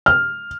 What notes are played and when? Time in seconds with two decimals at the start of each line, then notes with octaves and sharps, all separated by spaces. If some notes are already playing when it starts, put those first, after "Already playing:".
0.06 F6